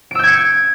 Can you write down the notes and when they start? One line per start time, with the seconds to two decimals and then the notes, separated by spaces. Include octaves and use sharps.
0.11 D7
0.15 E6
0.19 G6
0.23 G#6
0.28 C#7